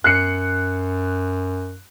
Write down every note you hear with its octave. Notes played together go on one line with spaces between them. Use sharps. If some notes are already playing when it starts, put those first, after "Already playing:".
F#2 F#6 C7 C#7